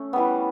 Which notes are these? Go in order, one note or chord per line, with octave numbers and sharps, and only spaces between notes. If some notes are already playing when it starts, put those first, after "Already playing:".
Already playing: A3 C#4
E3 G3 B3